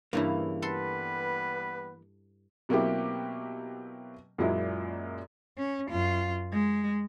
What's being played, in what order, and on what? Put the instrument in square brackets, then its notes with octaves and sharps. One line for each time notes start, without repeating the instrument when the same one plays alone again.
[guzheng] G2 C#3 E4 [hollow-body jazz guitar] E3 A#3
[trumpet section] G3 B3 B4 [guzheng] A4 C6
[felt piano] B2 F#3 A#3 C4 E4 G4
F#2 A#2 F#3 G#3 E4
[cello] C#4
F#2 F4
G#3